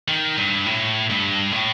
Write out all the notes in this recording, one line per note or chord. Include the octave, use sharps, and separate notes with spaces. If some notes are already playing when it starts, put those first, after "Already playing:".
D#3
G2
A2
G2
A2